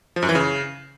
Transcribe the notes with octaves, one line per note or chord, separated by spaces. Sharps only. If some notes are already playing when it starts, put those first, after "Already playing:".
F3
F#2
E3
C#3